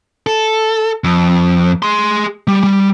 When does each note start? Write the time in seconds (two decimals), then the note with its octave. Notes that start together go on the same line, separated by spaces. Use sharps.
0.27 A4
1.04 F2
1.83 G#4 C6
2.48 G3
2.63 G3